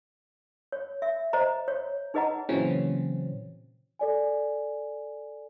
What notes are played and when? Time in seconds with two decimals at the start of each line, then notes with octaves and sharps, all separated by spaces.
0.72 C#5
1.02 E5
1.33 C5 D#5 A#5
1.68 C#5
2.14 D#4 G#4 B4 D#5 F#5 A#5
2.49 A#2 C#3 E3 F#3 C4 C#4
3.99 A4 D5 G#5